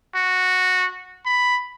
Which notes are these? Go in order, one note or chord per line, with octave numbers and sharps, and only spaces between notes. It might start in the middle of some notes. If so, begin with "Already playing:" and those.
F#4
B5